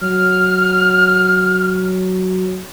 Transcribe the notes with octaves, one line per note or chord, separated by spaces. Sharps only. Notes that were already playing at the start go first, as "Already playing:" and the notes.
F#3 F6